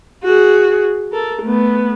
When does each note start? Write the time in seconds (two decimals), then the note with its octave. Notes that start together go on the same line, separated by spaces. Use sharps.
0.24 F#4 G#4
1.12 A4 A#4
1.42 A3 B3